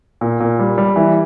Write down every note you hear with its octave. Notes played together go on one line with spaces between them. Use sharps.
A#2
A#2
G3
G3
E3